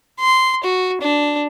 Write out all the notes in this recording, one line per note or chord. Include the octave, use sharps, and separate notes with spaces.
C6
F#4
D4